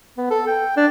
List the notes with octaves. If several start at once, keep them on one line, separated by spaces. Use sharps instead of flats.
B3
A4
G5
D4